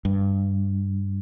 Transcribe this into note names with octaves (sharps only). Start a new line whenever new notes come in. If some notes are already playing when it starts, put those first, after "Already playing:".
G2